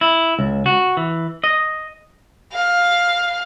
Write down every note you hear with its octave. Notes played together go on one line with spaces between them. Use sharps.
E4
C#2
F#4
E3
D#5
F5